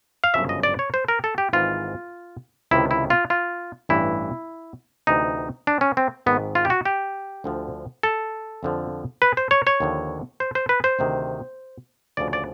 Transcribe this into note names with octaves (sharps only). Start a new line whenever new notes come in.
F5
G1 F#2 C#3 F3 E5
D#5
D5
C#5
C5
A#4
A4
G4
G#1 G#2 E3 F4
C#2 C3 D#3 E4
E4
F4
F4
A1 G2 E3 E4
D2 C3 E3 D#4
D4
C#4
C4
G#1 G#2 D#3 B3
F4
G4
F#4
G4
D2 D3 F3
A4
F2 D3 F3
B4
C5
C#5
C#5
D#2 D3 F3
C5
C5
B4
C5
D2 C3 D#3
D2 C#3 F3 D5
D5